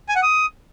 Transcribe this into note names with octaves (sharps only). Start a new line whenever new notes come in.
G#5
F#5
D#6